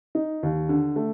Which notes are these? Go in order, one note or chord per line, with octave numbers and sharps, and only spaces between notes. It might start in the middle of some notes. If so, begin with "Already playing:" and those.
D#4
D#2
D3
A3